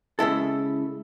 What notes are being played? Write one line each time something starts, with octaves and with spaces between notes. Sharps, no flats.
C#3 G#3 E4 A4